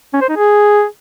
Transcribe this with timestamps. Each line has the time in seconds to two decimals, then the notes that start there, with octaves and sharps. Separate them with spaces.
0.14 C#4
0.21 C5
0.29 D#4
0.37 G#4